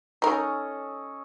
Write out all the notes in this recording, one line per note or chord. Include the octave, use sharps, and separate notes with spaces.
C#4 D#4 A4 A#4 D#5